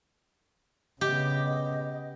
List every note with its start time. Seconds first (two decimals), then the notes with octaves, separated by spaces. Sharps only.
1.01 C#3 B3 G4 D#5